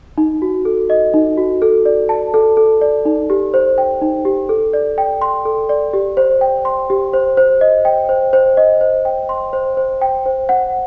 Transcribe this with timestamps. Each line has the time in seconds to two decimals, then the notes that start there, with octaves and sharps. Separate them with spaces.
0.18 D#4
0.42 F#4
0.65 A4
0.90 D#5
1.14 D#4
1.38 F#4
1.62 A4
1.86 D5
2.09 A5
2.34 A4
2.57 A4
2.81 D5
3.05 D#4
3.30 G4
3.54 C5
3.78 G5
4.02 D#4
4.25 G4
4.49 A4
4.73 D5
4.98 G5
5.22 C6
5.45 A4
5.69 D5
5.93 G4
6.17 C5
6.41 G5
6.65 C6
6.90 G4
7.13 C5
7.37 C5
7.61 D#5
7.85 G5
8.09 C5
8.33 C5
8.57 D#5
8.81 C5
9.05 G5
9.29 C6
9.53 C5
9.77 C5
10.02 G5
10.26 C5
10.49 F#5